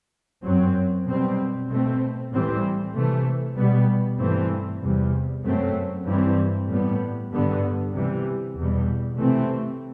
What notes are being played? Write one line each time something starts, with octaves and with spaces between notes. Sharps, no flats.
F#2 F#3 C4
B2 G3 C4
B2 A3 C4
A2 E3 G3 C4
C3 E3 A3
B2 G3 B3
G2 E3 A3 C4
E2 C3 G3
F#2 F#3 A3 C4
G2 E3 G3 C4
A2 G3 B3
G2 D3 G3 B3
C3 E3 G3
E2 B2 G3
C3 E3 A3 C4